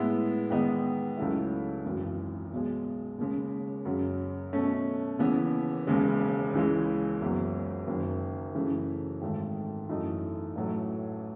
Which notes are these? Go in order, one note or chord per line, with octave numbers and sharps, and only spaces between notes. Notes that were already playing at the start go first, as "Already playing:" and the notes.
Already playing: A2 G#3 B3 E4
E2 D#3 G#3 B3 D#4
C#2 C#3 F#3 A3 E4
G#1 F#2 E3
B1 B2 G#3
D#2 C#3 G#3
F#2 C#3 F#3
B2 A3 C#4
D#2 C#3 E3 B3
E1 D#2 C#3 G#3
C#2 C#3 E3 G#3
F#1 E2 C#3 F#3
F#1 F#2 D#3
F#2 C#3 E3 A3
G#1 G#2 D#3 A3
F#2 E3 A3 D#4
A1 A2 F#3 A3